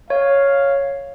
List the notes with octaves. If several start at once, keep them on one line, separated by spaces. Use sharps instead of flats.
C#5 F5